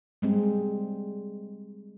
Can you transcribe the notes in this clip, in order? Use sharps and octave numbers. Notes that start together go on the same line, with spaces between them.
G3 G#3 C4